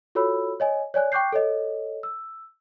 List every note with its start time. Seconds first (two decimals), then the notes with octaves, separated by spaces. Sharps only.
0.15 F4 F#4 A4 C#5 B5 E6
0.60 C#5 D#5 G#5
0.94 C#5 D5 G#5 F#6
1.12 G5 C#6 D6 F#6 G6 C7
1.33 A4 C#5 D#5
2.03 E6